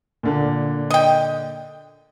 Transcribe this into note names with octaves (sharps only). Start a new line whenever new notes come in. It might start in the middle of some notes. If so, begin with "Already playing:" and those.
A#2 D3
D#5 G5